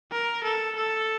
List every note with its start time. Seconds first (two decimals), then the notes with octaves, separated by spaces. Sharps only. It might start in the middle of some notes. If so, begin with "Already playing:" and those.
0.12 A#4
0.44 A4
0.76 A4